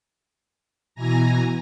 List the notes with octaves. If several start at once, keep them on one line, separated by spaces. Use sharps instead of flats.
B2 E3 G#5 A#5 A#6